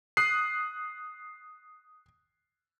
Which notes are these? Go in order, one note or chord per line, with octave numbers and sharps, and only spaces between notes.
D#6 F#6 C7